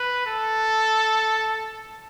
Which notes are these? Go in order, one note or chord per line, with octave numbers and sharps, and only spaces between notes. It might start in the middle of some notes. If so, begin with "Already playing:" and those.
Already playing: B4
A4